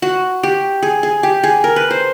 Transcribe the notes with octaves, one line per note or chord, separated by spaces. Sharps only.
F#4
G4
G#4
G#4
G4
G#4
A#4
B4
C5